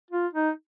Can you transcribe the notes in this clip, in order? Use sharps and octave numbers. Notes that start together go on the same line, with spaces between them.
F4
D#4